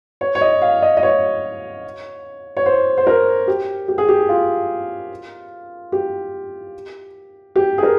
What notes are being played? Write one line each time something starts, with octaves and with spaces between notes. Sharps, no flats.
C#5
C#5
D#5
F5
D#5
D#5
C#5
C#5
C5
C5
A#4
G4
G4
G#4
G4
F4
G4
G4
G#4
A#4